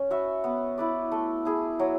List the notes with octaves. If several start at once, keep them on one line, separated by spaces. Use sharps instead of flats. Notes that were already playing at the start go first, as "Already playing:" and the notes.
Already playing: C#4
F#4 B4 E5
B3
E4 B4 D5
A3
E4 G#4
F#3